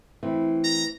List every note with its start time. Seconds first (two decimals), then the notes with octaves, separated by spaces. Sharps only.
0.23 E3 A3 C4
0.64 A#5